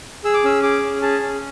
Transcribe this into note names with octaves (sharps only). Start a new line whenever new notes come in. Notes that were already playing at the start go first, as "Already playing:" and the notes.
G#4 E6
D6
C#4 E6
G#4 D6
C#4
G#4 A5
C#4